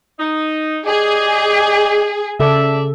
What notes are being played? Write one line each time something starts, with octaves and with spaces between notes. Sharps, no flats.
D#4
G4 G#4 D5 D#5
C#3 A4 D5 E5